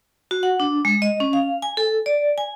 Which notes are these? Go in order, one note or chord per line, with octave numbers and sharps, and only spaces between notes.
F#4
F#5
D4
G#3
D#5
C#4
F5
G#5
A4
D5
G#5